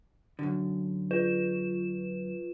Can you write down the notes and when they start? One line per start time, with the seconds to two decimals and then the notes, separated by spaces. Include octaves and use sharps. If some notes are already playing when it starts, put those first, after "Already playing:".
0.39 F#2 D3
1.11 F4 B4 E7